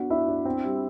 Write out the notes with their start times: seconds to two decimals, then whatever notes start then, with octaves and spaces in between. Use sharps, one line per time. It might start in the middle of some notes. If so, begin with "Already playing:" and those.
Already playing: B3 D4 F#4 F#5
0.10 D4 E4 E5
0.28 D4
0.45 C4
0.64 G3